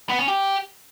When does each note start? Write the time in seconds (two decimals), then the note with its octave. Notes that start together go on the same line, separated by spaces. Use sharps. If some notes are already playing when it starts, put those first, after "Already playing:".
0.09 B3
0.19 C#4
0.28 G4